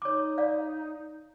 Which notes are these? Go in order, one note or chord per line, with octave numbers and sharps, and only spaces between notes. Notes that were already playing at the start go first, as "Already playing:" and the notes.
D#4 C#5 D6
D5 F5